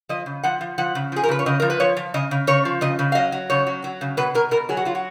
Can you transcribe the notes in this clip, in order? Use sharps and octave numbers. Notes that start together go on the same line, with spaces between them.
F3 D#5
C#3
F3 F#5
F3
F3 F#5
C#3
F3 G#4
A#4
C#3 B4
C#5
C#3 D#5
F3 A#4
B4
F3 C#5
F3
C#3 D#5
C#3
C#3 C#5
F3
C#3 D#5
C#3
F5
F#3 D#5
F#3
C#3 C#5
F#3
F#3
C#3
B2 B4
B2 A#4
B2 A#4
F#3 G#4
F#4
F#3 F4
F#4